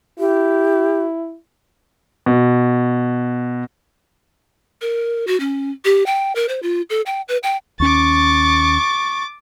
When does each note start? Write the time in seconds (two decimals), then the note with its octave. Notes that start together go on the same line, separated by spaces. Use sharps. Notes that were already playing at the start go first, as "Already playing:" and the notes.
0.19 E4 G4
2.26 B2
4.81 A#4
5.27 F#4
5.40 C#4
5.85 G4
6.06 G5
6.36 A#4
6.49 C5
6.63 F4
6.90 A4
7.06 G5
7.28 B4
7.43 G5
7.80 D#2 C#4 C#6 D6 A6